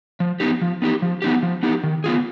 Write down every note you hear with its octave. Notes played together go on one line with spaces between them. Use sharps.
F3
B3 D#4 G4
F3
B3 D#4 G4
F3
B3 D#4 G4
F3
B3 D#4 G4
D#3
B3 F4 G#4